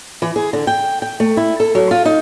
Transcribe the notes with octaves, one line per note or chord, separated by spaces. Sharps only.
E3
G#4
D3
G5
G5
A3
E4
A4
F#3
F4
D#4